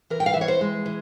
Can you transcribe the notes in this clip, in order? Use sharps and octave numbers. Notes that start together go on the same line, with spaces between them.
E3 A#4
G5
F5
E5
E3 C#5
C5
G#3
E3